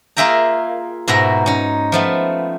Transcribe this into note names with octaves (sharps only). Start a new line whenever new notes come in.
A#3 F4 G#4 E5 G5 A#5
G#2 B2 F#4 E5 A#5
C#4 D#4
F3 A3 B3